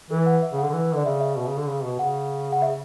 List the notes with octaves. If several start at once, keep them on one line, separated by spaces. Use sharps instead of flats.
E3 A4
F#5
E5
C#3
D3 F#5
D3
E3
D3 D5
C#3 E5
E5
B2
C#3
D3
C#3
B2
C#3 F#5
F#5
E5